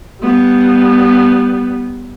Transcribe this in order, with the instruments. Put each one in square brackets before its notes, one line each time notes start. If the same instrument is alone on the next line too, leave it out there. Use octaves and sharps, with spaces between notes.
[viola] G3 B3